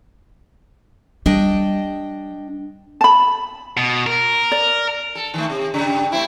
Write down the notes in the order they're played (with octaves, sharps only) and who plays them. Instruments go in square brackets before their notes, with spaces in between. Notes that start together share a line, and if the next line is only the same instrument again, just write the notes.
[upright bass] G3 [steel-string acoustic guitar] D4 D#5 G5
[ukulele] A5 B5
[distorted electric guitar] B2
A#4
[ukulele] D5
[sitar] A4
D#3 A3
C3
G2 C#3
A3 C4 E4